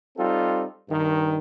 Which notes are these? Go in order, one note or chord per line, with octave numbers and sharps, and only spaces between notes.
G3 C4 D#4 F4 A4
G2 D#3